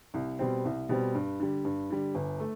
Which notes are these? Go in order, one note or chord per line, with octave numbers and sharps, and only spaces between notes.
C2
B2 G3 C4
C2
B2 G3 C4
G2
D3 G3
G2
D3 G3
G1
A3